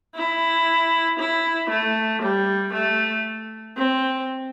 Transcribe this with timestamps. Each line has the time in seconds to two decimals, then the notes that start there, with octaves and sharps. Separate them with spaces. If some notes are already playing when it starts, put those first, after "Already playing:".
0.15 E4
1.19 E4
1.69 A3
2.22 G3
2.73 A3
3.77 C4